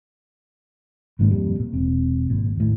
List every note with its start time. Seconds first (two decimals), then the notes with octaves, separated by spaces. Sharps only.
1.19 G#1 G#2 D#3 A#3
1.31 F2 A#2 G3
1.60 A#2
1.73 E1 C4
2.30 G#1 A#2
2.56 D#2 A2